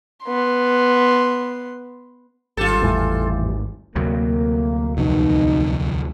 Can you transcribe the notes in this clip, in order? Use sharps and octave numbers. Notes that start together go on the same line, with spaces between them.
B3 C6
G#1 G3 F4 G4 A4 D6
E2 A2 E3
D2 C3 F#3 A#3
C2 F2 B2 D3 D#4